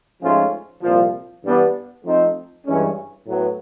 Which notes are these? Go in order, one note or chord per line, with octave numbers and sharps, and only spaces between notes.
G#2 F3 A3 C#4 F4
C2 A#2 F3
G2 E3 G3 B3 D4
F3 A3 C4 D#4
G2 E3 G#3 C#4
A2 F#3 B3